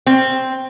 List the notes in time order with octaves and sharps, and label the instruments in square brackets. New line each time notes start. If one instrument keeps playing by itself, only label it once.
[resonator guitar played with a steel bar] C4